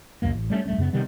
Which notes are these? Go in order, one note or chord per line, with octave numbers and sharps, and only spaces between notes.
C#2 F#2 A#2 A#3
A1
G3 A3 C4 C#4
D1 G3 A3 C#4
F#2 C#3 B3
C3 D#3 G3 B3